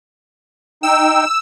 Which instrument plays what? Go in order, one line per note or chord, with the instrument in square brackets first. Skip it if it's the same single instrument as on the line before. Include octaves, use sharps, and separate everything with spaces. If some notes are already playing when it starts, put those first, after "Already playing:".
[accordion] D#4 G5 [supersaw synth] E6